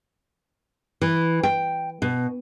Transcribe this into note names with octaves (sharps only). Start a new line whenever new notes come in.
E3
G5
B2